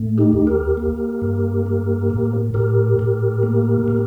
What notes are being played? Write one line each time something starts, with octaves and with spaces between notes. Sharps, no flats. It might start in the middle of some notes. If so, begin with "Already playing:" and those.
Already playing: A2 A3
D#4 G4
D#2
G4 A#4
A#3
G2
A#3
A2
A2 G4 A#4
A2
A#3
A2